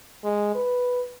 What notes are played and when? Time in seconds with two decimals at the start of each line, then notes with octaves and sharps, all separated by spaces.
0.24 G#3
0.55 B4